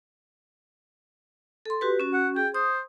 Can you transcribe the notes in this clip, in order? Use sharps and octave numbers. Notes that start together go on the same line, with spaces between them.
A4 C6
F#4 G4 B4
C#4 F#4
F#5
G#4 G5
C5 D#6